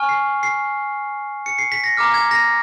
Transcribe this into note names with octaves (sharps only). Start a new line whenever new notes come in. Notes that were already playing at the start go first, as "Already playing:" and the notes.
Already playing: G#5 C#6 F6
C7
C7
C#7
C7
B6
A#6
A#5 D6 F6
G#6
A#6